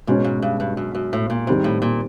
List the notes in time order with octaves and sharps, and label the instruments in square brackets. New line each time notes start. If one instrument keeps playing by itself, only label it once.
[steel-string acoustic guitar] G#2 [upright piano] B2 G#3 C#4
[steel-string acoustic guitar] G#2
G2
G2
F#2
F#2
A2
A#2
[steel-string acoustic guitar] G#2 [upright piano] D#3 G3 C4
[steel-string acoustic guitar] A2
A#2